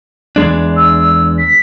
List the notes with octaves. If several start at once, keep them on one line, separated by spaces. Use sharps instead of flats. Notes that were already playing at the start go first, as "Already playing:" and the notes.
E2 G#3 D4
E6
B6